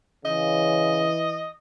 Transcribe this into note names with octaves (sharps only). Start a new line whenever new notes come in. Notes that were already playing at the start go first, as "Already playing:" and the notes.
C#3 E3 D#5